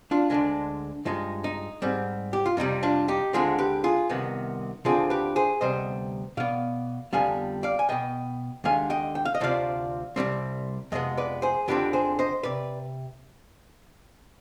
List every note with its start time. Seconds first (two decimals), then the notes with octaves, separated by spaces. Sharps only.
0.11 D4 F4
0.30 D2 D3 G#3 D4
1.05 G2 F3 G#3 D#4
1.44 D#4
1.82 G#2 G3 C4
2.33 G4
2.46 F4
2.57 F2 C3 G3 D#4
2.83 D4 F4
3.08 D#4 G4
3.33 D2 D3 G#3 C4 F4 G#4
3.59 G4 B4
3.84 F4 G#4
4.09 C2 C3 D#3 B3
4.85 D2 D3 F3 C4 F4 G#4
5.10 G4 B4
5.36 G#4 C5
5.61 D2 C3 G3 B3 C5 D#5
6.37 B2 B3 D5 F5
7.13 F2 D3 G3 B3 F5 G#5
7.63 D5 F5
7.79 G#5
7.89 B2 B3 D#5 G5
8.64 D#2 D3 G#3 F5 G#5
8.90 D#5 G5
9.15 G5
9.25 F5
9.35 D#5
9.40 D2 C3 F3 D5 F5
10.16 C2 C3 G3 C4
10.92 F2 C3 G#3 B3 D#5
11.17 B4 D5
11.42 G#4 C5
11.68 F2 D3 F3 C4 G4 B4
11.93 G#4 C5
12.19 C5 D#5
12.43 C3 B4 D5